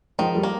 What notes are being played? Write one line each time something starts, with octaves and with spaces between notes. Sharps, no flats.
D#3 F3 G#3
G3
A#3